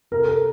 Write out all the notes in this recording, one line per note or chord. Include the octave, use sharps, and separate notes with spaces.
C3 A#4
A4
A#4